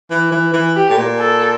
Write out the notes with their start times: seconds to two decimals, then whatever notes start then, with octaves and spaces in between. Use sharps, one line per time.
0.10 E3
0.32 E3
0.53 E3
0.76 G4
0.90 A2
0.98 A#2
1.19 A4